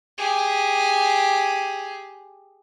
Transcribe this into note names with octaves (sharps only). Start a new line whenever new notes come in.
G4 G#4